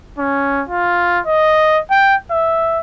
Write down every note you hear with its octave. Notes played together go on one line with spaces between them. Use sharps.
C#4
F4
D#5
G5
E5